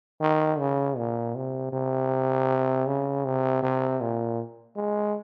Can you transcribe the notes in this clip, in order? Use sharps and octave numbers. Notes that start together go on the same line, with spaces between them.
D#3
C#3
A#2
C3
C3
C#3
C3
C3
A#2
G#3